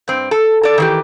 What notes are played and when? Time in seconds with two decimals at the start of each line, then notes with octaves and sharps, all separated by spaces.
0.08 G2 C4
0.31 A4
0.63 A4 D5
0.78 D#3 E3 G4